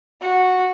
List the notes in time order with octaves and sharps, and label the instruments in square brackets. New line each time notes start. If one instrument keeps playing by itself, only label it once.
[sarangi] F#4